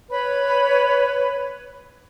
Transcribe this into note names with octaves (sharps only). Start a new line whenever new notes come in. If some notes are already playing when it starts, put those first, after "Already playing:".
B4 C#5 B5